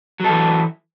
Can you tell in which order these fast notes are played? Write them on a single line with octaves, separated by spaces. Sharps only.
F#3 A4 E3